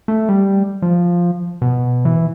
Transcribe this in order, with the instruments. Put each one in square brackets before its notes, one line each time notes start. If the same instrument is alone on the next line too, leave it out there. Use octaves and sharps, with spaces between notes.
[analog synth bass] A3
G3
F3
B2
E3